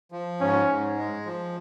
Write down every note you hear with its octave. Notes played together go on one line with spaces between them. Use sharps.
F3
G#2 C#4
G#2
G#3
F3